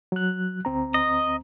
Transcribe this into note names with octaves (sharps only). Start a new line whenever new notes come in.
F#3 F#6
D2 C4 A#5
D#5